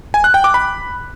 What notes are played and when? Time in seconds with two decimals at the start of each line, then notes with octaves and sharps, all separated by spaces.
0.14 G#5
0.24 F#6
0.34 G5
0.44 D6
0.54 B5